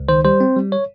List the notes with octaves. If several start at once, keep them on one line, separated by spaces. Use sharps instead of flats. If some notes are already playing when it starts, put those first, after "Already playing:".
Already playing: C#2
D#3 C5
G3 C5
C4
G3
C#5